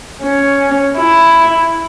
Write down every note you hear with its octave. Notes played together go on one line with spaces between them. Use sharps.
C#4
E4